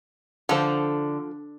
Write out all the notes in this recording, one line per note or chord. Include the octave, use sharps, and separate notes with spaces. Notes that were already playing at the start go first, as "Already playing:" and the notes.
D3 F3 A4 C5